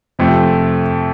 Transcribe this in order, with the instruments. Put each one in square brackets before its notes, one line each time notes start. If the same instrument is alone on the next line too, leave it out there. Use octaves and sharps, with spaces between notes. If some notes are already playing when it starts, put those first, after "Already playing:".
[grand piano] F2 C3 A3 C4